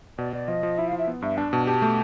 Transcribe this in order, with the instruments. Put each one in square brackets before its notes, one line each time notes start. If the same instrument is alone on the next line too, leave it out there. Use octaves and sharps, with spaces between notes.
[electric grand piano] B2 [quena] D5
[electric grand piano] B2 [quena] D5
[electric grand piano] F3 [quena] D#5
[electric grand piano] F3
[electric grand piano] E4 [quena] E5
[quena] F5
[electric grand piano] F3
[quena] E5
[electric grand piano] B3
[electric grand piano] G2 [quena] E5
[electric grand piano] D4 [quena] A5
[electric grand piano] B2 [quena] A5
[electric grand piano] G4 [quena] A5
[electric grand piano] A3